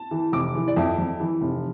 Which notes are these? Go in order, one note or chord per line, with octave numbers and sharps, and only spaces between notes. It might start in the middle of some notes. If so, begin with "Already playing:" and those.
Already playing: A5
E3
F1 D6
E3
D5
F2 E5
F2
E3
F1